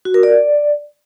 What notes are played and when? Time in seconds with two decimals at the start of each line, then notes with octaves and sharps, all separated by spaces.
0.05 F#4
0.14 A#4
0.23 D5